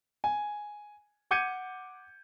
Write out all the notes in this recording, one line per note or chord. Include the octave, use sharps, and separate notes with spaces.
G#5
F#5 D6 G6 G#6 C#7 D#7